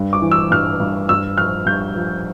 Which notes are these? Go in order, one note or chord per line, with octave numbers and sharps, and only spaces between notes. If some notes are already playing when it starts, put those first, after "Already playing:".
Already playing: G2 G3
D6
E3
E6
G2 F6
G2
G2 E6
F3 F6
G2 G6
F3